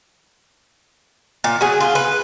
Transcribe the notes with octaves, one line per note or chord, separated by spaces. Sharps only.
A#2
F#3 G#4
F4
B4